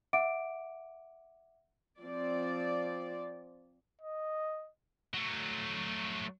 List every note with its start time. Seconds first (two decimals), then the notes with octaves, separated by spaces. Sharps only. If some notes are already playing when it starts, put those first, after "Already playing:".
0.13 E5 F#5 D6 D7
2.01 F3 C4 D5
4.01 D#5
5.14 F#3 A3